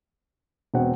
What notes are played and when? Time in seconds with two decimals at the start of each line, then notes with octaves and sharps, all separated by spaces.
0.74 E1 B2 C4 F#5